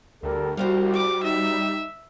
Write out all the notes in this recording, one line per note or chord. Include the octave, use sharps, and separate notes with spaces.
D2 G3 A4 A#4
C2 G3 F#4 C5 F5
D6
D#4 E5